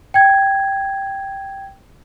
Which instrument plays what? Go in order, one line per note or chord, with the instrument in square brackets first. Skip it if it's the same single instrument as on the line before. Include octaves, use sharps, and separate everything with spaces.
[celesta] G5 G#6